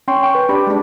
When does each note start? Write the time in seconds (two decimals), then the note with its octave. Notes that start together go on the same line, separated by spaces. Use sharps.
0.08 C#4 G5 C6 C#6
0.23 G5 C#6
0.35 B4
0.49 D4 G4 B5
0.67 G#3 D4